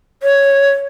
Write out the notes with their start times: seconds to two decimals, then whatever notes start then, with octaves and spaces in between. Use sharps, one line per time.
0.23 C#5